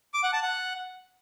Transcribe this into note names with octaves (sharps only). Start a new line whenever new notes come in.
D6
F#5
A5
F#5